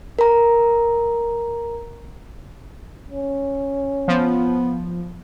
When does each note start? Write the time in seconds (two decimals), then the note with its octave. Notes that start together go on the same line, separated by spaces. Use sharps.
0.19 A#4 A#5
3.10 C#4
4.08 F3 B3